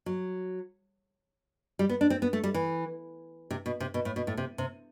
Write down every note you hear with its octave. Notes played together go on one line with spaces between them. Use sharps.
F#3
G3
B3
D4
C4
B3
A3
G3
E3
C3
B2
C3
B2
A2
B2
A2
C3
C3